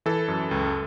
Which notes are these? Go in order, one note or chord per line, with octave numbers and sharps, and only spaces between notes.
E3 A4
F#2
C#2